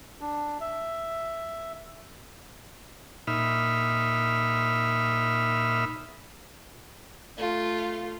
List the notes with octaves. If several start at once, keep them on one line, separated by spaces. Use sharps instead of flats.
D4
E5
A#2 D#4 E5 B5 F6
A3 F4